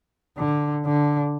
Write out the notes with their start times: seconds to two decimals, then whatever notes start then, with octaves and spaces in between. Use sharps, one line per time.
0.37 D3
0.85 D3